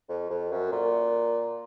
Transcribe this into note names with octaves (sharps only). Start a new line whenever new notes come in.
F2
F2
F#2
A#2